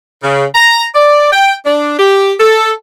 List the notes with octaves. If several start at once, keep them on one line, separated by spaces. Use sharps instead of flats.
C#3
A#5
D5
G5
D4
G4
A4